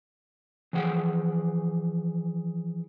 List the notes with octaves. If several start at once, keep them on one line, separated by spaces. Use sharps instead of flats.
E3 F3 G#4 F#5 G5